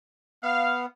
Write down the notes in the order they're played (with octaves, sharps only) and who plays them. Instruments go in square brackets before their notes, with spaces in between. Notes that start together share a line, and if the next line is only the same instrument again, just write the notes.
[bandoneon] B3 [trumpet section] F5